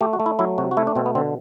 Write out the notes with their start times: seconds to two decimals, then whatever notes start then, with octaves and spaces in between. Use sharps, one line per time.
0.01 A3 G4
0.13 F#4
0.20 A3
0.26 E4
0.39 F#3 E4
0.58 C3 F#4
0.71 F#4
0.77 A3 E4
0.87 D4
0.96 B2 C4
1.06 B3
1.15 D3 C4